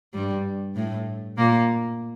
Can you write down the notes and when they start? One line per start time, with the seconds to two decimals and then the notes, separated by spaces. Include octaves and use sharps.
0.14 G2 G3
0.76 A2 A3
1.38 A#2 A#3